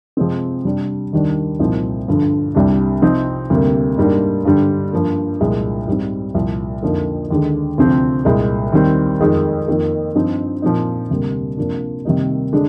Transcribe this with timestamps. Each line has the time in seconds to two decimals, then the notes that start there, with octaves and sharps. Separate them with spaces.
0.17 C3 F3 G#3 C4
0.65 C3 G3 D4
1.13 D#2 D#3 G3 D4
1.59 C2 A#2 F3 C4 D#4
2.08 G2 D3 F3
2.55 C2 C3 G3 D4
3.02 C3 F3 C4 D#4
3.50 D2 C3 G3 A#3
3.98 G#2 G3 A#3 D4
4.45 G2 D3 G3
4.92 G2 F3 A#3
5.40 C2 A#2 F3 G#3
5.87 G#2 G3 C4
6.34 C2 A#2 F3
6.83 F2 D3 F3 A#3 D#4
7.31 D#2 D3 G#3
7.78 D2 C3 F3 C4
8.25 C2 A#2 G#3
8.72 D#2 D#3 G3 C4
9.20 F2 D#3 G#3 D#4
9.68 F2 D#3 A#3
10.15 G2 F3 C4 D#4
10.62 A#2 F3 C4 D#4
11.10 D2 C3 G3 A#3
11.57 C3 F3 A#3 D4
12.05 C3 D#3 G3 A#3 D#4
12.53 D3 G#3 D4